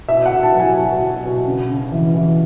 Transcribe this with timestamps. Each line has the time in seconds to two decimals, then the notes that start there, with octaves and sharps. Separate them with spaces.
0.08 B2 E5
0.26 F#5
0.32 B2
0.43 A5
0.54 F#3
0.60 G#5
0.78 F#3
1.00 B2
1.23 B2
1.46 C#3
1.69 C#3
1.92 E3
2.14 E3